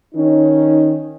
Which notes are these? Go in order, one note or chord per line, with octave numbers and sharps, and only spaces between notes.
D#3 C#4 D#4